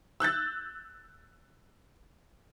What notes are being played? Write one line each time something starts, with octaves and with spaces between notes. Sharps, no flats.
E6 F#6 G6 A6